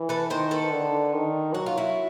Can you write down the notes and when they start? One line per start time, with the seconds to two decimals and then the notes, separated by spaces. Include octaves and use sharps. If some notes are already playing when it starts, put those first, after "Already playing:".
Already playing: E3
0.09 A4 B4
0.30 D#3 A#4 C5
0.51 A4 B4
0.72 D3
1.14 D#3
1.54 F#3 F#4
1.66 F4
1.77 E4 F#4